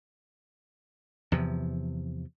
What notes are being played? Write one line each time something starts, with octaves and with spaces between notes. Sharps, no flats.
E2 C3 F3